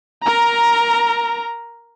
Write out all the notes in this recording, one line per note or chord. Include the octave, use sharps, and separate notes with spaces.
A#4 A#5